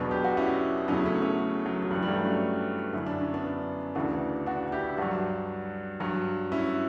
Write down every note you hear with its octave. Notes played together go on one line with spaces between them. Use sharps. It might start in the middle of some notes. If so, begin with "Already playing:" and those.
Already playing: E2 B2 F#3 B3 D4
G4
F#4
C#4 E4
E2 C#3 F#3 C#4 E4
A3 C#4
A3 C#4
F#3
F#3
G2 E3 G3
G3
F#3 A3
A3 C#4
F#2 D3 F#3 E4
D4
C#4
B3 D4
D2 C#3 E3 D4 F#4
D4 F#4
E4 G4
G2 F#3 D4 F#4
G2 F#3
C#4 E4